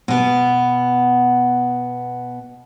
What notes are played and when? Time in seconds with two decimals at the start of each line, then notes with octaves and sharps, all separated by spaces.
0.08 B2 B3